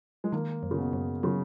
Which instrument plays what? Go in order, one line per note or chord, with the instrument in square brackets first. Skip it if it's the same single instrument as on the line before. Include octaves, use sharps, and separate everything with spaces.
[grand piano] G#3
[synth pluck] D#3 [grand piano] A#3
[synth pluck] F#2
[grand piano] C#3
B2
[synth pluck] F#2
[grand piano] C#3 [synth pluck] F#3